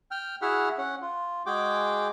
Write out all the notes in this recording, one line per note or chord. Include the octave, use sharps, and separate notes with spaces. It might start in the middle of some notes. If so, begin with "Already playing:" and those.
G5 F6
E4 F#4 G#4 E5 F#5 F6
C#4 F#5
F4
G#3 F#4 G#4 G5 D6